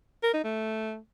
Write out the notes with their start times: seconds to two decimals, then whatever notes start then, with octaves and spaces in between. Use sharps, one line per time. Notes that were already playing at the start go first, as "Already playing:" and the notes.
0.23 A#4
0.33 D#4
0.44 A3